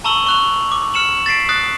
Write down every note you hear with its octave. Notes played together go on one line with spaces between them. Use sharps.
A5 A#5 C#6 E6 F#7
C#6 F#6 F7
D6
F6 C#7 E7 F#7
A6 B6 C7 D7
D#6 F#6 A6 C7